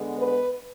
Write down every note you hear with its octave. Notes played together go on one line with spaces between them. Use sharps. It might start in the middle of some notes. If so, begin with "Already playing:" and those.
Already playing: D3 G#3 B3
B4